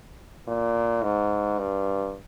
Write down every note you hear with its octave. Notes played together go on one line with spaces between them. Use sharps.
A#2
G#2
G2